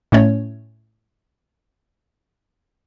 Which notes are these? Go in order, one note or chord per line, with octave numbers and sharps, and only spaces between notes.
A2 A3 C#4 C#5